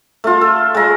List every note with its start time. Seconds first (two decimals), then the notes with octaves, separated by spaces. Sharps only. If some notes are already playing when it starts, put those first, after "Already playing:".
0.24 A3 F4
0.41 A4
0.74 G#3 A#5